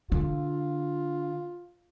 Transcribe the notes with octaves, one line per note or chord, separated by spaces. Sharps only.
D3 F4